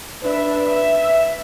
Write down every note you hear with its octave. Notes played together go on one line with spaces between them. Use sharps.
D4 B4 E5
E5